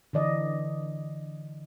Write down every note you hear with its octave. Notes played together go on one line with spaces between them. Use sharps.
D3 E3 D5 D#5